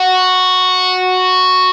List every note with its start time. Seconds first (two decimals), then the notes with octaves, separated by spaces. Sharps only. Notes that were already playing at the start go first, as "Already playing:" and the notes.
Already playing: F#4